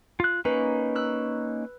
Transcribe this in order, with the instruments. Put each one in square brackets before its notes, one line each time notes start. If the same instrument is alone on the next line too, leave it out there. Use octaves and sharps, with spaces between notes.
[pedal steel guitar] F4 F#6
[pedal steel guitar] A#3 C#4 D#4 [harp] B4
[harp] E6 F#6